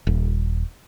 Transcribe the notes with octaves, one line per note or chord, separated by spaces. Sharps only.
D#1